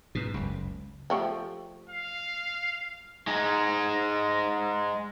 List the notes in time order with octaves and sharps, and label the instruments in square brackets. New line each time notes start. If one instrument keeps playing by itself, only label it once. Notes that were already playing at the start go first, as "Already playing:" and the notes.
[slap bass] G#2 B2
F#1 C#2
[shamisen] F3 A3 G4
[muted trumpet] F5
[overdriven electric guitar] G#3 D#4